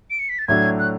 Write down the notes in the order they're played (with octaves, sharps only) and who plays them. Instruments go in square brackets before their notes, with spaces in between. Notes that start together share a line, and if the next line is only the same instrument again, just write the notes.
[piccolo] D7
C#7
B6
A6
[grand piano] A2 F#3 A3 D4 [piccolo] G#6
[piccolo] F#6